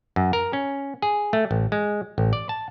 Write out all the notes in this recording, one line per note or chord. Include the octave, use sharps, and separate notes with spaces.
F#2
A#4
C#4
G#4
A3
A1
G#3
A1
D5
A5